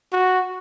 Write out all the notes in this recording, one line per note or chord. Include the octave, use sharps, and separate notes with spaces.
F#4